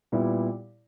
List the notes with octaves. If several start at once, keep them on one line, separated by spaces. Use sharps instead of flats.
A#2 G3 B3 E4 G4